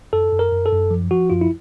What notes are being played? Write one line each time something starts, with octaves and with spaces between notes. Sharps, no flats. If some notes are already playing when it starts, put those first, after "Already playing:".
F#2 A4
F#2
A#4
F#2
A4
F#2
F3
F3 F#4
F#2 F4
E4